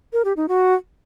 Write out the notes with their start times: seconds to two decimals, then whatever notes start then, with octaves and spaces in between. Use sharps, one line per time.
0.13 A#4
0.25 G4
0.37 D#4
0.48 F#4